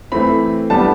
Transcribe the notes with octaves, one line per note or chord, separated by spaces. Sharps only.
E3 A3 C4 B5
D3 G3 B3 A5